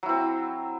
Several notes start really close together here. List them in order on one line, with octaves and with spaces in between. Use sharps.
F#3 E4 C4